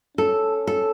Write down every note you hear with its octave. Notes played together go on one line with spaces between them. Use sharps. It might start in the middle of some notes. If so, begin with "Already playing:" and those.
C#4 A4
A4